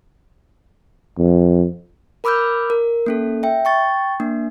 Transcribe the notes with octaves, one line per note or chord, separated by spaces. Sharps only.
F2
A#4 B5 D6 E6 F6 G6
A#4
A#3 C#4 A4
E5 G5
G5 C#6 A6
A#3 D4